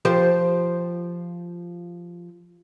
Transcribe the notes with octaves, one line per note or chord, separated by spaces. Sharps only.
F3 G4 C5